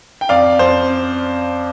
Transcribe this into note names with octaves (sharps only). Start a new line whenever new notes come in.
G5
F2 D5 F5
F2 C5